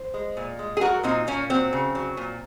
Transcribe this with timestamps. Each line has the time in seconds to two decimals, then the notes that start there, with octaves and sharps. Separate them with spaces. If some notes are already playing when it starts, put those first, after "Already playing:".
Already playing: C5
0.14 G#3
0.37 A#2
0.59 G#3
0.77 G#4
0.81 F#3 F#4 A#4
1.03 A#2 C4 D#4
1.27 A#2 A#3 C#4
1.50 F#3 C4
1.73 C#3
1.95 F#3
2.17 A#2